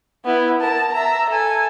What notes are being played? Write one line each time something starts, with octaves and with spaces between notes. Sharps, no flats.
B3 E4
A#4 A5
E5 A#5
A4 G#5